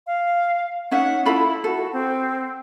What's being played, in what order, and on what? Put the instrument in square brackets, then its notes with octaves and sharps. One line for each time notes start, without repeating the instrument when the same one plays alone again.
[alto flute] F5
[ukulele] C#4 D#4 E5 [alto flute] F#5
[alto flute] E4 [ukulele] F4 A4 B5
[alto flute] F#4 [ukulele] A4
[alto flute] C4